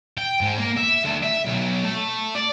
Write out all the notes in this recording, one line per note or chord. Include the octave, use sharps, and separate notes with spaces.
G5
G#2
A#3
E5
D2
E5
B1
A3
D5